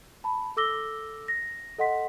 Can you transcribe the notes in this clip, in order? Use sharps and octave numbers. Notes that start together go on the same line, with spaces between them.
A5 B5
A4 D6 E6 A#6 G7
A#6
A4 D#5 F#5 C6 B6